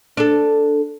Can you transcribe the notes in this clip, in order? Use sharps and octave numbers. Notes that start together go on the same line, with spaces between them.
D4 A4